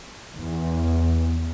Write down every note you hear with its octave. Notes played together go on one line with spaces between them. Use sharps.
E2